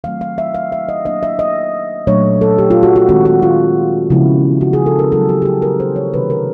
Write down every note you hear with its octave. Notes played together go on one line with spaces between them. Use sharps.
D#3 F#3 A3 C4 F5
F5
E5
F5
E5
D#5
F#3 A#3 D4 D#5
E5
D#5
A#2 F#3 A3 D4 C#5
A4
G4
F4
F#4
F#4
D#3 G#3 C4 F4 F#4
F#4
F4
C#3 F3 G#3 B3 E4
F#4
G#4
A4
A#4
F#3 B3 E4 A4
G4
G4
G#4
A#4
C5
C#5
C3 D#3 F#3 A3 D4 B4
A#4